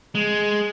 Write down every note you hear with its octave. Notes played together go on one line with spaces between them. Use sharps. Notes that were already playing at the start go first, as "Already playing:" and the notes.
G#3